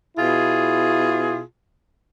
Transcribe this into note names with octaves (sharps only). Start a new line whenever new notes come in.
B2 E4 F4 G#4